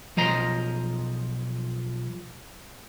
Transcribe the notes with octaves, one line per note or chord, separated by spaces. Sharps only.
B1 F3 D#5 A#5 C6